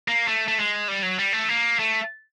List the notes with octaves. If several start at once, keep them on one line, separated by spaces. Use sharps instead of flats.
A#3
A3
A3
G#3
G3
F#3
G3
A3
A#3
A3